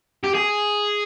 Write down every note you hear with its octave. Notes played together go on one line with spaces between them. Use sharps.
G4
G#4